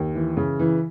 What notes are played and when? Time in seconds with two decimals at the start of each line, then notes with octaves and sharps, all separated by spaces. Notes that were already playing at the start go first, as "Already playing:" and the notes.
Already playing: D#2
0.15 E3
0.37 C#3
0.59 E3